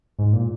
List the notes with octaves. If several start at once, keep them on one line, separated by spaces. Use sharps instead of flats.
G#2
A#2